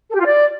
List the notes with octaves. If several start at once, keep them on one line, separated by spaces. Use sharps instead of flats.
A4
G4
F4
D5